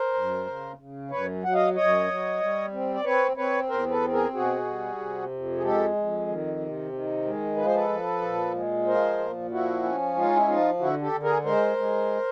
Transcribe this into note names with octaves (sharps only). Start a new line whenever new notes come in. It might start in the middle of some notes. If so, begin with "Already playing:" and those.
Already playing: A#4 C5
F#2
C#3
C#3
F#2 B4 C#5
F#3 F#5
D#5 F5
F#2 C#5 D#5
F#3
G3
C4
D5
C4 B4 C#5
C4 B4 C#5
E2 A#4 C5
A4 B4
C4
G#4 A#4
B2 F#4 G#4
G3
C3
F2
G#4
G#3 G4 A4
F2
D#3
C3
D#3
G#3
F3 B4
C5
A4 B4
F3
A#2
G#3
F3 A#4 C5
A#2
F3 E4 F#4
C#4
G#3 D#4 F4
E4
F3 D#4 F4
D3 E4 F#4
G4 A4
D3
G#4 A#4
G#3 A#4 C5
G#3